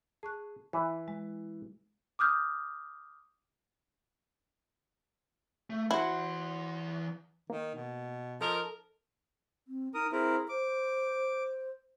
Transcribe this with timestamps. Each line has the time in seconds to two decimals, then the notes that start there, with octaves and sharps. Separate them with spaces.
0.23 G#4 A5 C#6 F#6
0.73 E3 B4 E5
1.08 G#3
2.19 D6 D#6 F6 G6
5.70 A3
5.91 E3 E4 F#4 C5 F#5
7.50 D#3 A#3
7.75 B2
8.41 F3 D#4 A4 A#4
9.68 C4
9.94 D#4 A#4 D#6
10.12 C4 E4 G#4 A#4
10.49 C5 D6